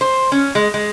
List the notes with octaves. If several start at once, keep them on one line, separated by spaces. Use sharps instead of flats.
C5
C#4
G#3
G#3